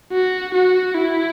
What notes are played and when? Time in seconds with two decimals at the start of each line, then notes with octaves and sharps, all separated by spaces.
0.12 F#4
0.54 F#4
0.95 E4